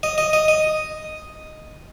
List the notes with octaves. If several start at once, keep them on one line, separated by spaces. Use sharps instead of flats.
D#5
D#5
D#5
D#5